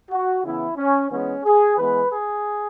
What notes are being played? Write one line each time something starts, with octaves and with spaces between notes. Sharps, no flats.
F#4
C#3 E3 B3 E4
C#4
E3 G#3 B3 C#4
G#4
E3 G#3 B3 B4
G#4